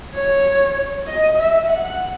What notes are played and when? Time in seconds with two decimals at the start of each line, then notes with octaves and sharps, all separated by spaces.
0.14 C#5
1.07 D#5
1.38 E5
1.70 F#5